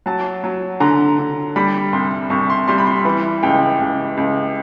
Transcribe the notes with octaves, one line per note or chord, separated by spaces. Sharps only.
F#3 A5
F#3
D3 A#5
D3
G3 B5
C2 C6
C2 C#6
C6
G3 C6
B5
C6
E3 B5
C#2 G5
C#2
C#2